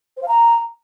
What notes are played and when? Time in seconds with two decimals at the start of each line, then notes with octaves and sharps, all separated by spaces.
0.17 C5
0.22 F5
0.28 A#5